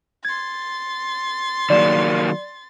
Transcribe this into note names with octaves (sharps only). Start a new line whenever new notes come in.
C6 G#6 A6
D#3 F#3 A#3 D5 E7